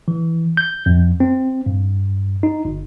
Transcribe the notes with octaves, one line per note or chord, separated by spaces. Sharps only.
E3
G6
F2
C4
G2
D#4
G1